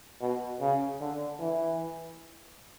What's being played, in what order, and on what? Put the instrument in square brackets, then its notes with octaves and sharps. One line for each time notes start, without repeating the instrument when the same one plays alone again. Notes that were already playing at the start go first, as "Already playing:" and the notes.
[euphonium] B2
C#3
D3
E3